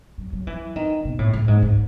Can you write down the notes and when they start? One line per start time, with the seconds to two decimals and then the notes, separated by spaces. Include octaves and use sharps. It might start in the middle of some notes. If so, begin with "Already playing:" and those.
0.18 F#3
0.33 F#3
0.47 E3
0.76 D#3
1.05 B2
1.19 A2
1.33 A2
1.48 G#2
1.62 G#2